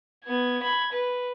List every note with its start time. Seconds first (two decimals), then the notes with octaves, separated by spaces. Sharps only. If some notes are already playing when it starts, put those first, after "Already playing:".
0.25 B3 G#6
0.63 B5 G#6
0.93 B4